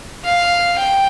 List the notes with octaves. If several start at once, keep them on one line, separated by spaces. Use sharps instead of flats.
F5
G5